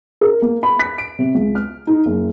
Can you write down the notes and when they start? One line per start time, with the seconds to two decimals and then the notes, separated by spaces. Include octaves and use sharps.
0.21 A#4
0.42 A#3
0.63 B5
0.79 B6
0.98 D7
1.19 C3
1.34 C#2
1.55 F6
1.87 D#4
2.06 F#1